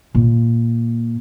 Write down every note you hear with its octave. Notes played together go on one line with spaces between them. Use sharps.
A#2